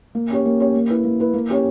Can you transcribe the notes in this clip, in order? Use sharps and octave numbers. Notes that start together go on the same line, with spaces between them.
A#3
C#4 G4 C#5
A#3
C#4 G4 C#5
A#3
E4 B4
A#3
E4 B4
A#3
C#4 G4 C#5